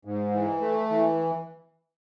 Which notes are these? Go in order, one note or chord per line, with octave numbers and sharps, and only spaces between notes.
G#2
E3
A3
E3